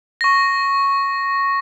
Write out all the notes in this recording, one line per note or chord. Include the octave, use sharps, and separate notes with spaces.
C#6 A#6